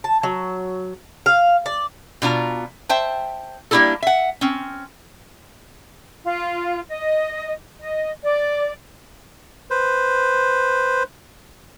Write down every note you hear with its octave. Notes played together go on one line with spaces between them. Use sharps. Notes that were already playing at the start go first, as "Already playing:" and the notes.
A5
F#3
F5
D5
B2 D4 F4 A#5
C5 E5 G5 A5
G3 A#3 D4 E4 G4 A4
E5 F#5
C4 C#4
F4
D#5
D#5
D5
B4 C5